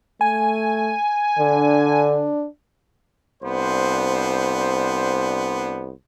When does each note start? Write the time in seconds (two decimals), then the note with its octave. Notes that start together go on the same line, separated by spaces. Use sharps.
0.21 A3 G#5
1.38 D3 D4
3.43 C2 B3 D4 C5